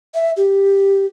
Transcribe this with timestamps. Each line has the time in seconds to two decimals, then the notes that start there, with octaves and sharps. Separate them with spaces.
0.14 E5
0.37 G4